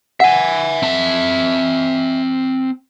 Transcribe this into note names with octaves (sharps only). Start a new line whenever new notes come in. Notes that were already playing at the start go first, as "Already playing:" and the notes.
E5 F#5 G#5
C4 A5